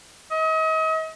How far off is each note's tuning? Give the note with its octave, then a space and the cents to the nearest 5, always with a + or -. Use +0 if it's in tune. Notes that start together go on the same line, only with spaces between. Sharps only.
D#5 +40